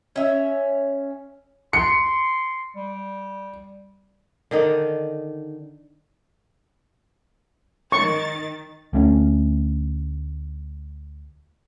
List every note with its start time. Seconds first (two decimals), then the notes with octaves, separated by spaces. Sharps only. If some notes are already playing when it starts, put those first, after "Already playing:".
0.16 C#4 E5
1.73 C6 C#7
2.76 G3
4.51 D3 D#3 D#4 D5
7.92 D#3 C#6 A6
8.93 D2 A3 C#4